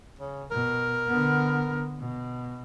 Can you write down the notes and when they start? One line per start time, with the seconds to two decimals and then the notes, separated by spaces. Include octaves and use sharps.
0.19 C#3
0.51 B2 A#4
1.08 D3 B3
2.00 B2